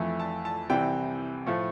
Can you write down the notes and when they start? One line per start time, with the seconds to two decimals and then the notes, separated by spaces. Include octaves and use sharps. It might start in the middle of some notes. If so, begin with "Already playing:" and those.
Already playing: F2 E3 A3
0.19 A5
0.45 A5
0.70 C2 C3 E3 G5
1.46 A2 F3 A3